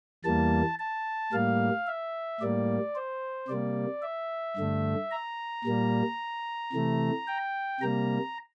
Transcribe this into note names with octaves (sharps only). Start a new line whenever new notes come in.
E2 E3 G3 A#3 A5
A5
A2 G3 A#3 F5
E5
A2 G3 A#3 D5
C5
C3 G3 A#3 D5
E5
G2 D3 A3
A#5
A#2 G3 A#3
C3 E3 A3
G5
C3 G3 A#3 A#5